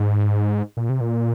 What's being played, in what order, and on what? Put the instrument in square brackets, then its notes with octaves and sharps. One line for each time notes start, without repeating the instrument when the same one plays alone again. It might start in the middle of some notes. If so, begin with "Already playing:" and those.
Already playing: [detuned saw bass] G#2
A#2
C3
A#2